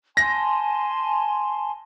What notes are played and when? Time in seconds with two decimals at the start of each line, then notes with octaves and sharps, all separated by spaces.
0.17 G#5 A5 C6 A#6